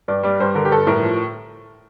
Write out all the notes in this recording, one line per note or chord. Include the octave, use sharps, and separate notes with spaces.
G2 D5
G3 D5
G2 C5
D3 A#4
G4
G2 A4
A2 A#4
F3